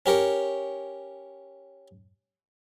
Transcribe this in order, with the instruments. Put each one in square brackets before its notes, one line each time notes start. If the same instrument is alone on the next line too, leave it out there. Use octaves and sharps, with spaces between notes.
[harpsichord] C#4 G4 A#4 C#5